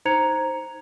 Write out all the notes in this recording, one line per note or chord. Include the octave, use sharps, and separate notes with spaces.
D#4 C5 A#5 G#6 C#7 F7